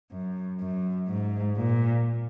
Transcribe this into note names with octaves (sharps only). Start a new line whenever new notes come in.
F#2
F#2
G#2
A#2